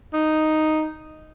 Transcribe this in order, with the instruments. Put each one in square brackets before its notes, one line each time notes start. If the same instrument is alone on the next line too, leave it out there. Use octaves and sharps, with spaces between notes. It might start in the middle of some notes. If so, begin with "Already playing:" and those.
[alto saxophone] D#4